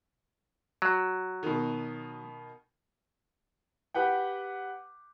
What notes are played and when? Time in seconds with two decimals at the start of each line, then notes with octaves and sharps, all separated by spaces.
0.82 F#3
1.43 B2 D#3
3.94 G4 B4 F#5 G5